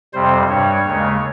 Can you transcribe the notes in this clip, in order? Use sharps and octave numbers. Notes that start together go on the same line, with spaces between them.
F2 C3 G3 C5
G2 G3 C#5
D#2 C#3 G#3